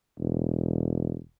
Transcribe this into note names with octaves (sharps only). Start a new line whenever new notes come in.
E1